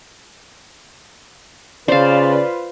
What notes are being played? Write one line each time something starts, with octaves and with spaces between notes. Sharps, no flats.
C#3 F4 B4 C5 D5 F5